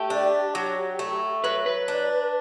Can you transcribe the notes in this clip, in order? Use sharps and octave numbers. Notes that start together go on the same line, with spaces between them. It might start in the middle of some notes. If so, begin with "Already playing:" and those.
Already playing: A3 G4
D4
F#3
A3
F#3 B4
B4
D4